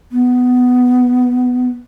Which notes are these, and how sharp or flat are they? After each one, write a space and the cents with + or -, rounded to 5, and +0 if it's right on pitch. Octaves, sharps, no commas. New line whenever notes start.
B3 +10